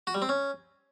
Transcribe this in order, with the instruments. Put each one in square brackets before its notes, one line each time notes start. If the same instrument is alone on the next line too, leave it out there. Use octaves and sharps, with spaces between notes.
[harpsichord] F#4
G3
C4
C#4